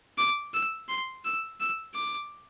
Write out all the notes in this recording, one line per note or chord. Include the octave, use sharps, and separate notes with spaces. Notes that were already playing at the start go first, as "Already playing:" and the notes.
D6
E6
C6
E6
E6
D6